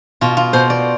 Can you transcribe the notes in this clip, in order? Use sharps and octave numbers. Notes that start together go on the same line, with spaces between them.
B2 F4
F4
B2 C5
D5